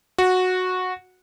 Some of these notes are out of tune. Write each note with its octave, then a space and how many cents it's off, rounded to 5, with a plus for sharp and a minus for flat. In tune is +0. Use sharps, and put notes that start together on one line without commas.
F#4 -10